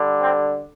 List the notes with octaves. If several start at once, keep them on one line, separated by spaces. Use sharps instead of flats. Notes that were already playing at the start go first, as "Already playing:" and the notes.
Already playing: D3 G3
C4